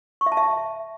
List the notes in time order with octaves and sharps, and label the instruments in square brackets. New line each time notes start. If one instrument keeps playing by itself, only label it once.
[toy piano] C#6
E5
A5
E5